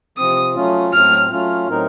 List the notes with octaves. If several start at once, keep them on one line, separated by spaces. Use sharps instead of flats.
C3 F3 C4 D#6
F#3 A3 C#4 F4
A2 F#3 A3 C4 F6
F#3 A3 C#4 F4
A2 F#3 C4 D#4 A#4